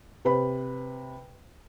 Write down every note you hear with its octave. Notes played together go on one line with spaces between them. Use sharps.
C3 B4 B5